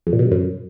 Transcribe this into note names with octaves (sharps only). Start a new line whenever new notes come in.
F2
A#2
B2
G2
F#2